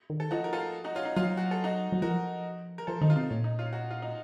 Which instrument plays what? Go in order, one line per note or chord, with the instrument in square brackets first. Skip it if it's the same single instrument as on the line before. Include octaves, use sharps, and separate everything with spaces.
[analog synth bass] D#3
[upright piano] A4
[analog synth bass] F3 [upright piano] D#4 F#4
[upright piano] A#4
F4 A4
D#4 F#4
C#4 F4
D#4
[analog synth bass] F#3 [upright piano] C#4 F4
[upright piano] F#4
A4
D#4 F#4
[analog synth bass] F#3
[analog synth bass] F3 [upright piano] F#4 A#4
[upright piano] A#4
[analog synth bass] F3 [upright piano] A4 C5
[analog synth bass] D#3 [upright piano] D#4
[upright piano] F4
[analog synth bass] C3 [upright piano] D#4
[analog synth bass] A#2 [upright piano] C#4
[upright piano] D#4
C#4 F4
D#4 F#4
F4
D#4